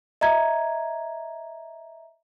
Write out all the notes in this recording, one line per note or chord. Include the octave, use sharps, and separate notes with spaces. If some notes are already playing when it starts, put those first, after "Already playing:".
D#5 E5 A#5 G#6